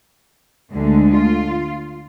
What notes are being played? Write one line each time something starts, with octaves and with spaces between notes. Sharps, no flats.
D2 D3 G#3
F4